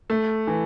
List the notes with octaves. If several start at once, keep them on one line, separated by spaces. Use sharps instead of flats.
A3
E3